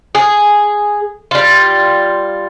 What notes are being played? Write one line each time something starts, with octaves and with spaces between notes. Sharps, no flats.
G#4
G3 F4